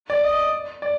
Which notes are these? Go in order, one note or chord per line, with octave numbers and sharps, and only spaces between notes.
D5
D#5
D5